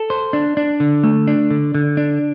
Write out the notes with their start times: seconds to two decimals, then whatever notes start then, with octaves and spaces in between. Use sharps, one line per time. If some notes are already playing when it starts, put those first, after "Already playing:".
Already playing: A4
0.10 C5
0.33 D4
0.57 D4
0.80 D3
1.04 A3
1.28 D4
1.51 D3
1.75 D3
1.97 D4